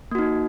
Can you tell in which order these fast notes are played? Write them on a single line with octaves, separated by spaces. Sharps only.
A#3 F#4 D#4